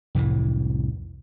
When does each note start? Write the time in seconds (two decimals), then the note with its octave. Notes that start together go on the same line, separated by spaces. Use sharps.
0.15 C2 F2 A2 E3